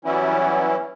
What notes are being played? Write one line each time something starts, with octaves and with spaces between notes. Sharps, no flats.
E3 F#3 G3 B3 C#4 E4